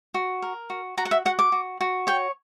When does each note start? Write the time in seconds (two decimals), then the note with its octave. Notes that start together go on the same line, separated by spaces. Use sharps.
0.14 F#4
0.42 A#4
0.70 F#4
0.97 F#4 A#5
1.05 F#5
1.11 E5
1.25 F#4 F#5
1.39 D6
1.52 F#4
1.81 F#4
2.07 C#5 G5